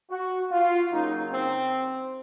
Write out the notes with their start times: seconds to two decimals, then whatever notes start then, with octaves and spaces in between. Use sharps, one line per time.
0.11 F#4
0.51 F4
0.92 C#3 F#3 A#3 D#4
1.33 C4